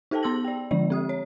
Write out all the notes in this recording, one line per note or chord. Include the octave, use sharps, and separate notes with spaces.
D#4 G4 A4 C5 G5 A5
B3 C6 E6 A#6 F#7
D5 G5
D3 F3 G#3 D5
C4 G4 D#6
C#5